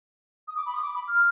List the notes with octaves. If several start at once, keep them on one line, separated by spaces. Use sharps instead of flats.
D#6
D6
B5
D#6
D6
B5
F6